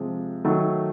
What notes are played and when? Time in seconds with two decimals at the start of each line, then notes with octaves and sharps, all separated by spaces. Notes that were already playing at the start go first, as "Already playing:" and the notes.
Already playing: C3 F3 G#3
0.45 D#3 F#3 A3